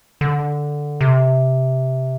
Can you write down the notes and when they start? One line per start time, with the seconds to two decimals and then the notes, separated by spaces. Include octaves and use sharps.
0.21 D3
1.01 C3